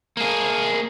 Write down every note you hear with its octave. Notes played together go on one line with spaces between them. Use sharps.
A#3 G#4